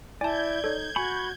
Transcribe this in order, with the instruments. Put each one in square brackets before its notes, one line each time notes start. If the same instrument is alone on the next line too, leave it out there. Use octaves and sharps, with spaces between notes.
[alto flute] E4 [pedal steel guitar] D5 [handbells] G#5 A5 [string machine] G6 G#6
[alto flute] D#4 [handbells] A4 C#5
[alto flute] F#4 [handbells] G#5 [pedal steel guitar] B5 C#6